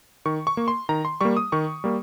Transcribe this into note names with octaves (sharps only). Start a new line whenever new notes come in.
D#3 C#6
C#6
A#3
C6
D#3 A#5
C6
G3 A#3 C#6
D#6
D#3 C#6
G3 A#3